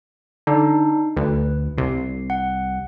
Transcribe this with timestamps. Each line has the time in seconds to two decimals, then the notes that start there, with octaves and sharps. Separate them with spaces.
0.47 D3 D4 D#4
1.17 D2 B4
1.78 C2 C7
2.30 F#5